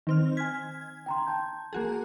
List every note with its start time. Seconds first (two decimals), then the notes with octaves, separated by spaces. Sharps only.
0.07 D#3 C4 F6
0.37 G#5 F6 G#6 B6
1.06 G5 A#5 C6
1.27 G5 A5 G6
1.73 A#3 F#4 G#4